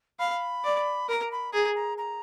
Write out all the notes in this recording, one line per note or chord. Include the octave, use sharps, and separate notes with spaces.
F5 B5
D5
A#4 A#5 B5
B5
G#4 A#5
A#5
A#5